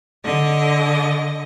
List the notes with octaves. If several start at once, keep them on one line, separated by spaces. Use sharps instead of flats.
D3 D#5